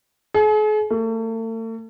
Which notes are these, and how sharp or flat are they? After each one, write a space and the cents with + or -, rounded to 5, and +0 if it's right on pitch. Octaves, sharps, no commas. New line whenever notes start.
G#4 +45
A3 +40